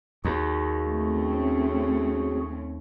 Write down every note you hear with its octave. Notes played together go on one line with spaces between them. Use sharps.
D#2 F#4 G#4
A3 C4 C#4